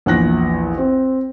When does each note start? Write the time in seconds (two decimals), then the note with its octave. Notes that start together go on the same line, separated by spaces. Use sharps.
0.06 A#1 E2 F#6 A#6
0.78 C4